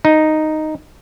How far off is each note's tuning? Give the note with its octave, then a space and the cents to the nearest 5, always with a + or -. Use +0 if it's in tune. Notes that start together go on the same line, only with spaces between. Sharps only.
D#4 -5